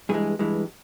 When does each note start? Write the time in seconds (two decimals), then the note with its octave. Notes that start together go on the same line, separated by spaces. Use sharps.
0.09 G2 E3 G#3 G#4
0.39 G2 E3 G#3